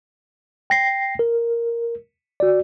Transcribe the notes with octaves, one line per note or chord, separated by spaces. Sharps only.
G5 A#6 C7
A#4
F#4 D5